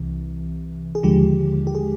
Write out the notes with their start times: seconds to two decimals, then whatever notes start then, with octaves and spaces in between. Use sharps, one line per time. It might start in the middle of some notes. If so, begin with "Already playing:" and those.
Already playing: C2 C3 E3
0.95 G#4
1.03 D#2 D3 F3 G#3 G4
1.67 G4
1.75 G#4